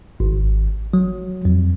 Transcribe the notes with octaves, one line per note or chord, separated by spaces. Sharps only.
G#1
F#3
F2